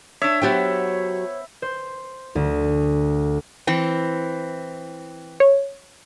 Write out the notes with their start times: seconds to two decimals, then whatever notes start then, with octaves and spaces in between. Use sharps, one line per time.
0.22 D4 C#5 E5
0.41 F#3 B3 F#4 G4 C5 C#5 G5
1.62 C5
2.35 D2
3.67 E3 C4
5.40 C#5